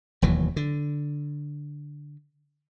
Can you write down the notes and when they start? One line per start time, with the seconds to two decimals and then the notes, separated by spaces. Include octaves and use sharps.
0.22 E1 D#2 E3 F#3
0.56 D3